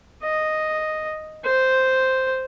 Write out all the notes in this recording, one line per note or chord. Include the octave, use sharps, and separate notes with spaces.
D#5
C5